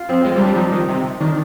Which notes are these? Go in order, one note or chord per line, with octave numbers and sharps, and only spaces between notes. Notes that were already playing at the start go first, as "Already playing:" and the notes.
Already playing: F4
F3 C4
G#3 C4
G3
D4
G3
F3 D#4
D#3
C3
D#3 D4